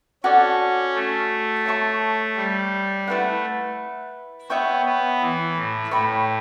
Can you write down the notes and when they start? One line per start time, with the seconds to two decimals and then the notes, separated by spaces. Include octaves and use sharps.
0.24 C#4 F#4 A4 D5 A5
0.94 A3
1.66 C#5 E5 A5 C#6
2.36 G3
3.08 A3 E4 B4 F#5
4.50 B3 C#5 E5 G5 C#6
4.85 B3
5.21 E3
5.57 A2
5.91 A2 C#5 G5 B5